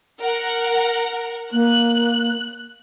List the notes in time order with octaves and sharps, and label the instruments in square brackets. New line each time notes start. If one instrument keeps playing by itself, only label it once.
[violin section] A#4 F#5
[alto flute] A#3 [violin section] F#6